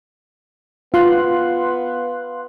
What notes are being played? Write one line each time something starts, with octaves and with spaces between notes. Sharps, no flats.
B3 F4 F5 C6 F#6